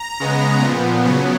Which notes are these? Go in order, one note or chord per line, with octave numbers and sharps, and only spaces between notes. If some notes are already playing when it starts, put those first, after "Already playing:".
Already playing: A#5
C#3 G#3 B3
A#2 F3 B3
C#3 F#3 B3